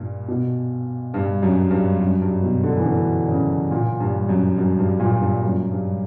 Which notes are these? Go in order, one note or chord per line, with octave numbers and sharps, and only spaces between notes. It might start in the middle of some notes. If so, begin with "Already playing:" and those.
Already playing: G2 A#2
B2
G2
F#2
G2
F#2
G2
B2
D3
E3
D3
C#3
A#2
G2
F#2
F#2
G2
A#2
G2
F#2
G2